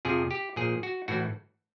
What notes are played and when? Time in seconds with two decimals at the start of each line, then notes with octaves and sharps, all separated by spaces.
0.05 F2 C3 F3 G#4
0.31 G4
0.56 A#2 F3 G#4
0.83 F#4
1.08 A2 E3 F#4